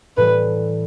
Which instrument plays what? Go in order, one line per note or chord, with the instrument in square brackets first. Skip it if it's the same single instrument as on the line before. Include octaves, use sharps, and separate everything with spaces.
[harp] A2 E3 G3 [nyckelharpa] B4